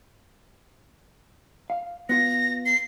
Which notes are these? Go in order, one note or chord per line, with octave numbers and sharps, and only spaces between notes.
F5
B3 F4 A#6
C7